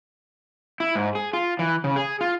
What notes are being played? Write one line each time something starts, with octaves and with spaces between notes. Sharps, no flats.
E4
G#2
G#4
F4
E3
C#3
G#4
F4